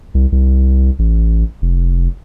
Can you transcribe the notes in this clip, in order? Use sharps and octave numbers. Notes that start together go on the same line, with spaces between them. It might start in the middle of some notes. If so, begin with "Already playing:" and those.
C2
C2
A1
F1